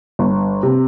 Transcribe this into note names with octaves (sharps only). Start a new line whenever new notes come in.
G1
C3